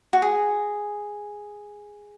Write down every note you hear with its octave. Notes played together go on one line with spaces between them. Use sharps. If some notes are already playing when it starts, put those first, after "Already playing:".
F#4
G#4